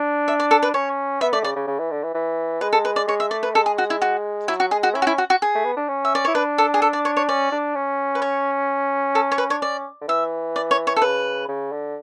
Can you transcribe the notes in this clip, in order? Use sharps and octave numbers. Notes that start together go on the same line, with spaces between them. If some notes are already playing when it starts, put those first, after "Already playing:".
Already playing: D4
E5
D5
A4
B4
C#4 C#5
B3 E5
A3 D5
C#3 D5
C#3
C#3
E3
D3
E3
E3
G#3 B4
A4
B4
D5
G#3 C#5
E5
A3 D5
B4
G#3 A4
G#4
F#4
E4
F#4
F#3 E4
F#4
G#3 G#4
F#4
C#4 E4
F#4
E4
F#4
F#4
G#4
A3
B3
D4
C#4
E5
D5
E4 C#5
D4 B4
A4
G#4
A4
D5
C#5
C#5
C#4 D5
D4
C#4
B4
C#5
A4
C#5
B4
D4 C#5
C#4 D5
D3
E3 E5
D5
C#5
C#5
A4
C#3 B4
C#3
D3